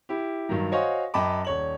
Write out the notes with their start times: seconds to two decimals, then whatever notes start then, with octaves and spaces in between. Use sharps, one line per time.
0.09 E4 G4
0.49 G2 D#3 F#3
0.72 F#4 C5 C#5 D#5 F5 G#5
1.14 F#2 D#5 G5 A5 B5 D6
1.45 D#1 C#5 F#7